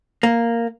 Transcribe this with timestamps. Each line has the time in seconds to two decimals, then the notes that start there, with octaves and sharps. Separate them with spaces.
0.23 A#3